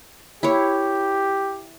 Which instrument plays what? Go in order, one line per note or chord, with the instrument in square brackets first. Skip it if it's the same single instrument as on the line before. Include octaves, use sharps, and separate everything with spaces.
[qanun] E4 C#5 [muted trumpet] G4